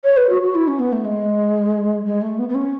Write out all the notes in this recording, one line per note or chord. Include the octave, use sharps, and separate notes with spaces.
C#5
B4
F#4
F#4
E4
C#4
B3
A3
G#3
G#3
A3
B3
B3
C#4